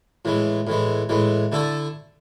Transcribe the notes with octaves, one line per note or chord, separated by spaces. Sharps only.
A2 E3 G#3
A2 E3 G#3
A2 E3 G#3
D3 A3 E4 A4